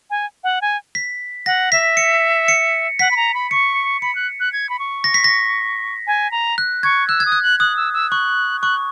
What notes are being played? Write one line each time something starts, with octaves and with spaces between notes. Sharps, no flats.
G#5
F#5
G#5
B6
F#5 A#6
E5 B6
C#7
C#7
F#5 B6
B5
A#5
B5
C#6 C#7
B5 C#7
F#6
F#6
G#6
B5
C#6
A#6
B6
A#6
G#5
A#5
F#6
C#6 G#6
E6 F#6
G#6
D#6
F#6
F#6
D#6 F#6
E6
E6
C#6 F#6
C#6 F#6